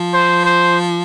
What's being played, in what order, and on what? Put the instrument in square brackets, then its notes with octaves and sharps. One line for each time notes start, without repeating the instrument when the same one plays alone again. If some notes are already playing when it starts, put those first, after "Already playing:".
Already playing: [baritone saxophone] F3
[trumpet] C5
C5